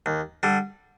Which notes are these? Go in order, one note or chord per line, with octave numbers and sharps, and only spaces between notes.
D#2
D3 G3